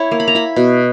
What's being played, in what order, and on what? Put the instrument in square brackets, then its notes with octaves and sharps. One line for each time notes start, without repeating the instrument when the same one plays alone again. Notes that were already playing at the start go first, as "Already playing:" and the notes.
Already playing: [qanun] E4 C#5
A#3
B5
A#5
E4 B5
B2